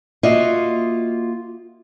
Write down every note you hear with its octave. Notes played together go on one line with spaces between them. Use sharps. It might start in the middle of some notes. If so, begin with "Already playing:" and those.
A#3 F4 F#4 D#5 E5 F#5